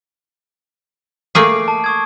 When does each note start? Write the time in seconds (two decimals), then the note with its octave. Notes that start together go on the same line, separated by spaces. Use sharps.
1.35 A3 A#3 G#4 D6 C7 D7
1.68 A5
1.84 C#6 D#6 G#6